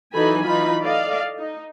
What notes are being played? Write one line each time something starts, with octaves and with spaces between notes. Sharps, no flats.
E3 F#3 D#4 A4 G#5 B5
E3 D#4 F4 B5
A4 D5 D#5 F5
D#4